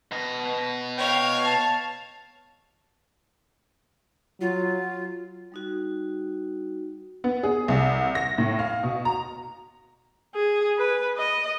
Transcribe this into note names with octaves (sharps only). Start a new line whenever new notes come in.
B2 D#5
C#5 F5 G5
A5
F#3 F4
G3 D#4 F#4
B3
G#4
C2
A#6
A2
F5
B2
A#5
G#4
B4
D#5